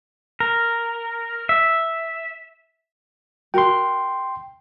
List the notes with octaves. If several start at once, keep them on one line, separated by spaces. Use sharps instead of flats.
A#4
E5
F#4 A#4 G5 C6